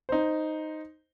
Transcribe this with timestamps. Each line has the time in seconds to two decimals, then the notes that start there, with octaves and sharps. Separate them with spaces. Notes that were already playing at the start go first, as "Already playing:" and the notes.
0.09 D#4 C5